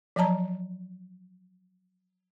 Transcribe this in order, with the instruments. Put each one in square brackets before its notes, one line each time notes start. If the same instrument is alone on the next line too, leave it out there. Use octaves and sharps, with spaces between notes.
[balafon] F3 F#3 D#5 A5 A#5